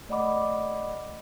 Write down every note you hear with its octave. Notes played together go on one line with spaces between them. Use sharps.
A3 D5 D#5 F#5 B5 D6